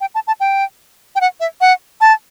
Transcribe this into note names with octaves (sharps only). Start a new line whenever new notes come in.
G5
A5
A5
G5
G5
F#5
E5
F#5
A5